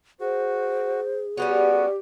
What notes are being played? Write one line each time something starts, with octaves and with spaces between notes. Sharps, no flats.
F#4 G#4 C5
G3 G#3 B3 C#4 F#4 G4